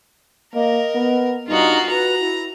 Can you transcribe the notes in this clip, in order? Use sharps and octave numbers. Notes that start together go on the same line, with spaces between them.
A#3 A#4 D#5
B3
G2 D#4 F4 F#4
F#4 B4 A#5
E4